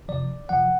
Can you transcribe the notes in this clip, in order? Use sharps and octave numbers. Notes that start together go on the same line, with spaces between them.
F2 C3 F3 D5
F2 C3 F3 F#5